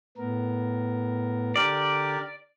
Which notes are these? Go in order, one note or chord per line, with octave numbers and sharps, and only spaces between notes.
A2 B3 A#4
D3 D4 G4 A#4 D5